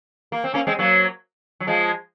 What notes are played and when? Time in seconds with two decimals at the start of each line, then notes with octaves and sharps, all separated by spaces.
0.32 A#3
0.44 C4
0.54 A#3 C#4
0.67 G#3 C4
0.79 F#3 A#3
1.60 F#3
1.67 F3 G#3